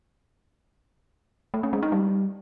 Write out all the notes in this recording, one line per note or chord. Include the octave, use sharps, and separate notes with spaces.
A3
C#4
G#3
D#4
G3